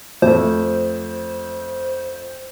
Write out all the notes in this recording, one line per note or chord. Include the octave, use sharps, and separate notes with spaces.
F2 A3 C5